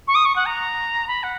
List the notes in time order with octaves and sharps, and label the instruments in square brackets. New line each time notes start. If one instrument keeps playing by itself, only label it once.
[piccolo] C#6
D#6
C#6
F#5
A#5
B5
F#5